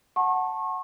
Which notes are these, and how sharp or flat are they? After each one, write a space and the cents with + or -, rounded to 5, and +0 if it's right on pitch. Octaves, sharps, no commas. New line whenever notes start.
F#5 +0 A5 +0 C#6 -35